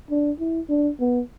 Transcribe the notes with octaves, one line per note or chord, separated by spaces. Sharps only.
D4
E4
D4
B3